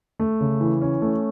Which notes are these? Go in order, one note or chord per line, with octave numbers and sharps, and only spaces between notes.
A3
C#3
E3
C#4
A3